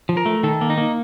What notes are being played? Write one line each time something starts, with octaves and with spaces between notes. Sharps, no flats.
F3
A#4
A3
D#3 A4
A#3
D#4
A#3